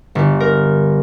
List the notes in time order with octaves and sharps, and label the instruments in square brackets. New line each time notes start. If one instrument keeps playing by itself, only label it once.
[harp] G1
A#4